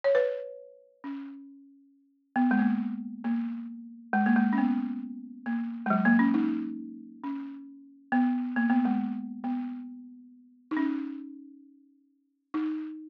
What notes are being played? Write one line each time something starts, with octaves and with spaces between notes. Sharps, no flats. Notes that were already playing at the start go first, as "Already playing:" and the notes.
C#5
B4
C#4
B3
G#3
A#3
A#3
G#3
A#3
G#3
C#4
B3
A#3
G#3
F#3
A#3
C#4
D#4
C#4
B3
A#3
B3
G#3
B3
D#4
C#4
D#4